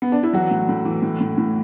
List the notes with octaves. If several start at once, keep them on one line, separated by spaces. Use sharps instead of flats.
B3
D4
E4
E3 F#3 F#4
A2
A2
E3
A2
A2
A2